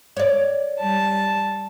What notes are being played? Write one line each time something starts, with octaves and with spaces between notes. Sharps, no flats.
C#5 D5
G3 A5